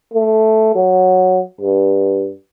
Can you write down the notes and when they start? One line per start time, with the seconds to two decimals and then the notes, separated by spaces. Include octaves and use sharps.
0.14 A3
0.75 F#3
1.61 G2